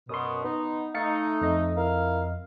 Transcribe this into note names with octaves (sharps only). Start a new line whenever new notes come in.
F#2 B2 C6 D#6
B3 D#4
A3 D#4 F5 A6 C#7
F2 D#5
E4 A#4 F5